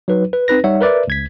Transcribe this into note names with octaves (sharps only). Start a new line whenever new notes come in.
F#3 D#4 B4
B4
C4 D#4 B4 A#6
G3 D#4 C#5 E5 F#5
A#4 B4 D5 E5
C#2 G#6 B6